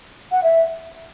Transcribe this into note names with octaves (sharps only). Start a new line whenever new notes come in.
F#5
E5